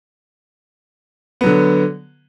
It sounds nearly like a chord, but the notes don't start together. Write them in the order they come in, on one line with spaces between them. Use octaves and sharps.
B3 F#3 D3